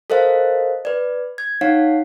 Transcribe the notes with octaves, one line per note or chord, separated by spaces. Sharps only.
A4 A#4 C5 D#5 F5
B4 D5
G#6
D#4 C#5 F5 F#5